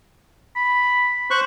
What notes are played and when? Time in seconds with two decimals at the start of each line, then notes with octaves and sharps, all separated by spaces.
0.56 B5
1.31 C5 C#6 F#6